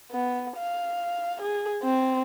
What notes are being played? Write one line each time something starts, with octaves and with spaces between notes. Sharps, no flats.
B3
F5
G#4
C4